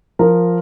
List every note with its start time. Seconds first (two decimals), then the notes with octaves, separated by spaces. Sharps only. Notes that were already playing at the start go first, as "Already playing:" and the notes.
0.19 F3 A#4